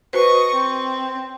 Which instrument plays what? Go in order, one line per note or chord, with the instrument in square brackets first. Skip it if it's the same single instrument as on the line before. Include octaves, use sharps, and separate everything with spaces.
[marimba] F#4 B4 C5 [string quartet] D#5 C#6
[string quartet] C4